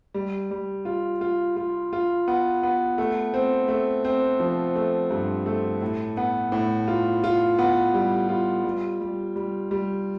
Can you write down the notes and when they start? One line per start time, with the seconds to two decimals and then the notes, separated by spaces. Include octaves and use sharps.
0.14 G3
0.51 G3
0.85 F4
1.21 F4
1.56 F4
1.93 F4
2.28 B3
2.63 B3
2.98 A3
3.34 C4
3.69 A3
4.05 C4
4.40 F3
4.75 A3
5.11 G2
5.46 A3
5.81 A2
6.17 B3
6.52 A2
6.88 F4
7.24 F4
7.59 B3
7.94 G3
8.29 F4
8.64 G3
9.01 G3
9.36 G3
9.71 G3